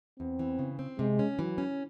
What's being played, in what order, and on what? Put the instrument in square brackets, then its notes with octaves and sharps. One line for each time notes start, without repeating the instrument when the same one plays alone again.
[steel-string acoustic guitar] E2 [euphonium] C4
[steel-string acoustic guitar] E3
C#3
C4
[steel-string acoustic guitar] C3 [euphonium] G#3
[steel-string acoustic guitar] C#4
[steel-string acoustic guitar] E3 [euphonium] F#3
[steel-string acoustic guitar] C#4